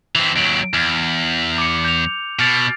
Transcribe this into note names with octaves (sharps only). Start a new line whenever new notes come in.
E3 C4
D#2 F#3 D7
E2 F6
D6 C#7
G6 F7
B2 F6 A6 D7